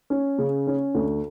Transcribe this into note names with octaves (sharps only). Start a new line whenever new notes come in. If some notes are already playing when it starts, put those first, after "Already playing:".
C#4
C#3
C#4
D2